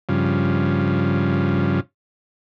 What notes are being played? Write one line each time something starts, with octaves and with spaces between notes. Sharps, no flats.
G2 C#3 F3